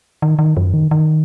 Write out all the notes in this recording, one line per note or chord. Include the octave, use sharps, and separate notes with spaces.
D#3
D#3
F#2
D#3
D#3